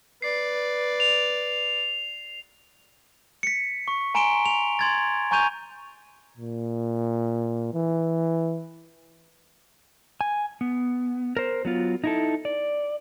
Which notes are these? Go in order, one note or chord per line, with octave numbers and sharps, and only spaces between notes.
B4 D5 C7
F7
B6 C#7
C#6
G#5 A#5 C6 D7 E7 G7
F7
C6 G#6 A6
G#5 A#5 C#6 G6 D#7 F7
A#2
E3
G#5
B3
A#4 C5
F#3 B3 F4
D#4 E4 A4
D5